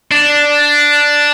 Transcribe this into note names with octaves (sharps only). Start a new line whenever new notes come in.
D4